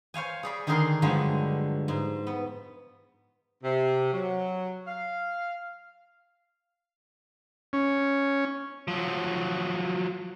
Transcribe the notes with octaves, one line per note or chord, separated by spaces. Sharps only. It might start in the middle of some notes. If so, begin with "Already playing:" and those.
C5 C#5 F5 G#5
G#4 D5 B5
D3 D#3 D4 G#4 A#4 C6
G2 D3 F3 F#3 G#3
G#2
B3
C3
F#3
F5
C#4
F3 F#3